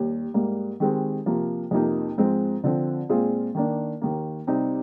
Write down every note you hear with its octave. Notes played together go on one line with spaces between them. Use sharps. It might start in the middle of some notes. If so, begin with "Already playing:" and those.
Already playing: D#2 G3
G#2 G3 A#3
D#3 G#3 C4 G4
C3 F3 A#3
F2 C3 F3 A#3 D#4
G#2 F3 G#3 C4
D3 F3 C4
A#2 G#3 C4 F4 G#4
D#3 A#3 D4
D#2 D#3 A#3
C3 G3 C4 D#4